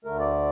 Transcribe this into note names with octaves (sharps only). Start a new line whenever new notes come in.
D2 D3 A3 A#4
D5